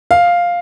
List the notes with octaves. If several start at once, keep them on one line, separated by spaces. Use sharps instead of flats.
F5